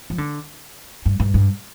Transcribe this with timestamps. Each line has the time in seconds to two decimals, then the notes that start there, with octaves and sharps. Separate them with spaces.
0.10 F3
0.18 D3
1.06 G2
1.20 G2
1.34 G2